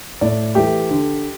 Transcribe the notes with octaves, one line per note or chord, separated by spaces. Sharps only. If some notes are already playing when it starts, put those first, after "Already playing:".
A2 D5
E3 A3 G4
D3